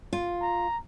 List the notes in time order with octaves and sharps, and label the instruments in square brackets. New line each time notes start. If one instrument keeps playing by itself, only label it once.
[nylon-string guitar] F4
[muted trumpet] A#5